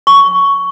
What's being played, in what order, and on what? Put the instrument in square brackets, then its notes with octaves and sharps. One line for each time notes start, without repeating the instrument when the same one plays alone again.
[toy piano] C#6